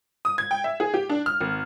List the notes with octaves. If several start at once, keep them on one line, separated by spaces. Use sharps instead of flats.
D#6
G#6
G5
E5
G#4
G4
D4
F6
G#1